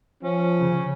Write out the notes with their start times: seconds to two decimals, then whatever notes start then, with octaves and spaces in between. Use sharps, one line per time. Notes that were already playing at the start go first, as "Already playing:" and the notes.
0.23 F3 C#4
0.58 C#3